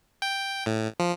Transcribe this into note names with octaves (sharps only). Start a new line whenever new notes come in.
G5
A2
F3